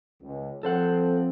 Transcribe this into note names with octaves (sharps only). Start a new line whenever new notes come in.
C#2
F3 C4 A4 C5 F#5